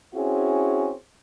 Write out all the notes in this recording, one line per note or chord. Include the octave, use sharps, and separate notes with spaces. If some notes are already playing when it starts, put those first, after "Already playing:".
C4 C#4 E4 F#4 G#4